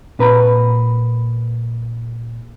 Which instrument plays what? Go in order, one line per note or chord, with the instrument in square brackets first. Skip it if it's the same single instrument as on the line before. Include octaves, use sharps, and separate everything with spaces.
[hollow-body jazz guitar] A#2 B4 A#5